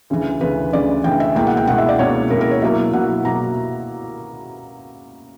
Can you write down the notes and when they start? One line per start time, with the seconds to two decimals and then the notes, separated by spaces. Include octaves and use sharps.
0.10 D2 C#3 E3
0.41 D2 C#3 E3 B4
0.73 D2 C#3 E3 D5
1.04 D2 C#3 E3 G5
1.20 E5
1.35 C#2 B2 A#3 E4 G5
1.47 F#5
1.57 G5
1.67 C#2 B2 A#3 E4 F#5
1.78 E5
1.89 D5
1.99 C#2 B2 A#3 E4 C#5
2.30 C#2 B2 A#3 E4 A#4
2.41 A#4
2.51 C#5
2.62 B2 F#3 A#3 E4 E5
2.93 B2 F#3 A#3 E4 F#5
3.25 B2 F#3 A#3 E4 A#5